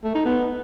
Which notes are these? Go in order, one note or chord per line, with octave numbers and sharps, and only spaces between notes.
A3
D#4
B3